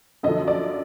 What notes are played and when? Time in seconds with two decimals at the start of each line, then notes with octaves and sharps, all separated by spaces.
0.23 F#2 D3 F3 D#5
0.48 D5